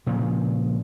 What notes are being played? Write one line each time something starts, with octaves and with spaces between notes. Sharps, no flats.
A#2 C#3 F3